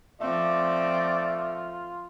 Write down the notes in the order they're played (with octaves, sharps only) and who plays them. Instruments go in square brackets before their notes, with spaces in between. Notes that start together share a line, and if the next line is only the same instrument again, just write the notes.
[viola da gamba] F3 C4 [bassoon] A3 [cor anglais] F4 [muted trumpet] D5